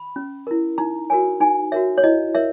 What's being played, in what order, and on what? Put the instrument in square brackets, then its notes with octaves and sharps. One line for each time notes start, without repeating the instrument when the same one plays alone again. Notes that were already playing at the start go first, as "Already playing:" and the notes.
Already playing: [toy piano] B5
C#4
E4 A#4
D#4 A#5
F#4 A#4 C#5 G#5
D#4 G#5
F#4 A#4 C#5 E5
C#5
E4 D#5
A#4 C#5 E5